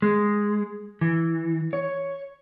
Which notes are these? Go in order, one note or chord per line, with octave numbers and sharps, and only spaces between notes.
G#3
E3
C#5